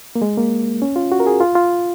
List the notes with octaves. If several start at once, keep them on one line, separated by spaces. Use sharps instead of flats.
A#3
G#3
A#3
C#4
F4
F#4
A#4
G#4
F4
F4